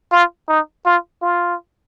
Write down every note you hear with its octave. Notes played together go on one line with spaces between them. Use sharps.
F4
D#4
F4
F4